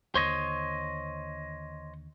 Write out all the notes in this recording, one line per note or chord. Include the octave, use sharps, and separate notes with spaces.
D#2 D3 C5 C#5 D#5